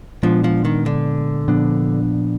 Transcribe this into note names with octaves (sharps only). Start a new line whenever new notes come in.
A#2 F3 G#3 B3 D4
F3
D#3
D3
A#2 F3 B3 D4